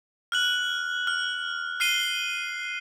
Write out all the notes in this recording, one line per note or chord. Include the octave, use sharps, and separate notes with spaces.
F6 F#6 F#7
F6
F6 C7 D#7 G7